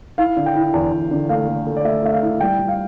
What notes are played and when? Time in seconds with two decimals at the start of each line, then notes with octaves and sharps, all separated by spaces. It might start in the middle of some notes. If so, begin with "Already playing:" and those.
0.18 E4 F5
0.37 D3
0.46 G5
0.55 E4
0.74 E2
0.92 E2
1.11 D3
1.29 A3 F5
1.48 A3
1.67 A3
1.77 D5
1.85 A3 E5
2.03 A3 E5
2.12 F5
2.23 E4
2.40 G3 G5
2.59 G3
2.68 F5